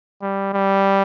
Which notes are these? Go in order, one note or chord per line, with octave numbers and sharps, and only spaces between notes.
G3
G3